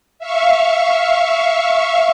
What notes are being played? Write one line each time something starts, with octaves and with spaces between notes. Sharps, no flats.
E5 F5 C#6